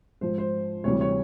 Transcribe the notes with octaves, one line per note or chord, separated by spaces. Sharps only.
G#2 F3 C5
C5
D2 C3 E3 G3 C#5
C#5